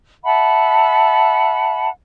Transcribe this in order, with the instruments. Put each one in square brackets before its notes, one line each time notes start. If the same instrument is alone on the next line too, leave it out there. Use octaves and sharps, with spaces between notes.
[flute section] E5 F#5 A5 B5